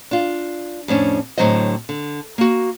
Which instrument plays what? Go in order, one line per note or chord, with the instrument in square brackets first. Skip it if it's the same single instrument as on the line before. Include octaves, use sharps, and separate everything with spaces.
[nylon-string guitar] D4 F4
F2 A2 C#4 D4
A2 D3 F#3 C4 C5 D#5
D3
A#3 F#4